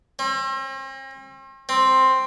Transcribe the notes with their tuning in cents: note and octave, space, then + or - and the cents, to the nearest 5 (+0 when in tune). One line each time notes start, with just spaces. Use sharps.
C4 +45
C4 +5